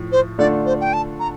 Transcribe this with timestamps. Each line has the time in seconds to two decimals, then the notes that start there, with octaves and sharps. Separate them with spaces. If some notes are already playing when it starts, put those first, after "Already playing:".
Already playing: A2 F3
0.12 C5
0.39 D3 A3 D4 F4 A4 D5
0.66 C5
0.81 G5
0.93 A5
1.20 A#5